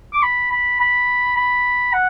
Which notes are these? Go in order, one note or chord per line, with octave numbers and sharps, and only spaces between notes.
D6
B5
B5
B5
B5
F#5